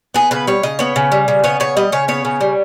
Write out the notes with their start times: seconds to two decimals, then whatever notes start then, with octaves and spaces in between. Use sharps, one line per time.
0.14 B3 G#4
0.31 C#3 B4
0.47 G3 C#5
0.63 C#3 D#5
0.79 B3 C#5
0.96 C#3
1.12 G3
1.28 C#3
1.44 B3 C#5
1.60 C#3 C#5
1.77 G3 D#5
1.92 C#3 C#5
2.08 B3 C#5
2.25 C#3
2.41 G3